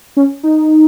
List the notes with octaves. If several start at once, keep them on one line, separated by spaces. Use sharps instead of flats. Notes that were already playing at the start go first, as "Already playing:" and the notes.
C#4
D#4